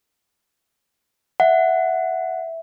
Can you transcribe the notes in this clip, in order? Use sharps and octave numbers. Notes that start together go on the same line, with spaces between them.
E5 F#5